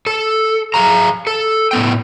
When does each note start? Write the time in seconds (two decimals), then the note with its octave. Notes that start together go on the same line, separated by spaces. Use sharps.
0.07 A4
0.74 G#4 A4 F5 A#5
1.27 A4
1.71 A2 B3 G5